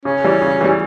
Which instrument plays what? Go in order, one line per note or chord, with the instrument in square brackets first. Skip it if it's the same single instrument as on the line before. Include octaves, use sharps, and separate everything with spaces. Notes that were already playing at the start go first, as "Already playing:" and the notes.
[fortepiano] C#3 [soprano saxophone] C#4
[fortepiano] E3 G3
C#3
E3 G3